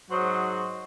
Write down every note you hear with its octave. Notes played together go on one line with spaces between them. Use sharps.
G#2 F#3 F#4 C5 D#5